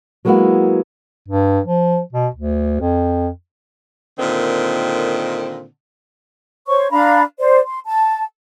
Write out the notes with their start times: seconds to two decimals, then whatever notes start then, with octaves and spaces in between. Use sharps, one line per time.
0.25 F#3 G#3 A#3 B3 E4 F#4
1.28 G2
1.66 F3
2.13 B2
2.35 D2
2.80 F2
4.18 A#2 D3 D#3 C4
6.67 C5 C#5 C#6
6.91 D4 F5 A#5 B5
7.39 C5 D5
7.64 C6
7.85 A5